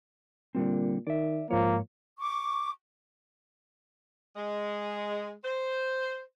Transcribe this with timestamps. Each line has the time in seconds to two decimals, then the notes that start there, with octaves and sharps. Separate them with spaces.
0.55 A#2 D3 G3 C4
1.07 D#3 D5 E5
1.51 G#2 F3 A#3 C#5
2.19 C#6 D6
4.36 G#3
5.44 C5